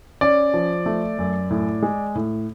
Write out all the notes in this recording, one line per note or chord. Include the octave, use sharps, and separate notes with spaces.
C#4 D5
F3
A3
F#2
A2
G#3
A2